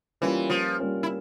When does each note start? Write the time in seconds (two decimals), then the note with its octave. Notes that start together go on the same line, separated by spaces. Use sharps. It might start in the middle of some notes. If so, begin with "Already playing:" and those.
0.21 E3 G3 A#3 C#4 F4
0.50 F3
0.79 G3 A#3 C#4 F4
1.03 E4